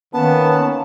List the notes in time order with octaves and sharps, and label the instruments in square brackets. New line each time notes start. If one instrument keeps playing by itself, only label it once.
[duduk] D#3 [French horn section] A#3 C#4 [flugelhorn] B3 [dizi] A5